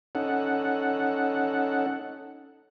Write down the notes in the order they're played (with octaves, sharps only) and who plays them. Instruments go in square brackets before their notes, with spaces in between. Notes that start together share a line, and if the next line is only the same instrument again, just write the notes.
[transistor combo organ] C#4 D#4 A4 F#5